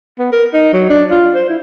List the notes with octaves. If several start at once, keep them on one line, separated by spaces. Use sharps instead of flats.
B3
A#4
D#4
F#3
D4
F4
C5
E4